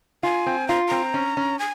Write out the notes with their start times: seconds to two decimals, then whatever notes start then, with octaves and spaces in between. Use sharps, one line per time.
0.23 F4 G#5
0.46 C4
0.68 F4 A#5
0.88 C4 A#5
1.14 C#4
1.37 C#4
1.59 G#5